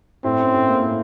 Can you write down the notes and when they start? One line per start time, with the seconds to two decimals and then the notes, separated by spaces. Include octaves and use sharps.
0.24 A2 C4
0.39 C#4
0.54 A2
0.68 A#3
0.82 A2